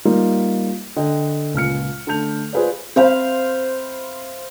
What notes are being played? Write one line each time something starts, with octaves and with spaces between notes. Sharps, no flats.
G3 A#3 D#4 F4
D3 D#5 G5
C#2 A#2 F6 C#7
D3 A3 A5 G6 F7
F4 G#4 B4 C5 D5
C4 C5 F5 B5